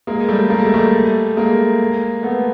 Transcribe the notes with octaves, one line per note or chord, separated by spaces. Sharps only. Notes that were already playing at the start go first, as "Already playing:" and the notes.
G#3 A#3
G3 A3
A#3
A3
G#3
G3 A3
G#3 A#3
A3 B3